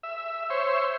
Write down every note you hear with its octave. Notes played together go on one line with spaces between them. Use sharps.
E5
C5 C#5 E5